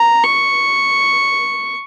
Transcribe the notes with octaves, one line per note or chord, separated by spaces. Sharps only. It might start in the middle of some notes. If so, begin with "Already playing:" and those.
Already playing: A#5
C#6